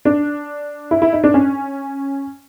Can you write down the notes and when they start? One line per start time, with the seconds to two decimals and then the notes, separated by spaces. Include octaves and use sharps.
0.05 D4
0.91 E4
1.02 E4
1.13 D#4
1.24 D4
1.34 C#4